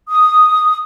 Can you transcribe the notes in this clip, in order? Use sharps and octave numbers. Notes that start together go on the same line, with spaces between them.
D#6